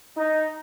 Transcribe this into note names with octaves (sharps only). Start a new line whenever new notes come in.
D#4